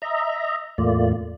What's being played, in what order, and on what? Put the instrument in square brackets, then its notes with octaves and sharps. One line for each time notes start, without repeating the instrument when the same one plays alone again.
[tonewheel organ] D#5 E5 A#5
E2 A2 A3 A#3 F4 D5